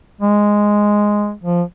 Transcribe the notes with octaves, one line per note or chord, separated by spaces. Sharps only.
G#3
F3